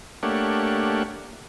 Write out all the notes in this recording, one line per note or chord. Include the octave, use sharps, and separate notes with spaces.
A3 A#3 D4 G4 C#5 F#5